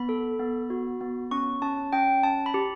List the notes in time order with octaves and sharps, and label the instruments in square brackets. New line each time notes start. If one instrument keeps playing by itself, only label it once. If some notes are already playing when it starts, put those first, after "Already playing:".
Already playing: [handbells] B3 B5
A4
B3
F#4
B3
C#4 C#6
C#4 A5
C#4 G5
C#4 A5
B5
G4